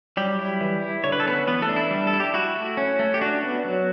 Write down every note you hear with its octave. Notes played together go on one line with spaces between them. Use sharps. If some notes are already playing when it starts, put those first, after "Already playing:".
F#3 G3 G4
E4
E3
E4
D3 C#5
B4
A4
B3 C#4 B4
E3 B3 B4
A3 A4
D4
E4
G3
A4
E4
G4
E4 F#4
A3
C#4
A3
G4
D4 F#4
B3
F#3